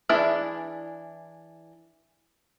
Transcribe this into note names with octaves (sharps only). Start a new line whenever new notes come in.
E3 D4 E4 G#4 D5